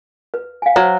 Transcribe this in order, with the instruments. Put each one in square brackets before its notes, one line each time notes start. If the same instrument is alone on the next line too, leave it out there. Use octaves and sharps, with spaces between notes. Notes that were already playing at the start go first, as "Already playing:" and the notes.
[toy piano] B4
F5 G#5
[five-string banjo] F#3 [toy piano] C5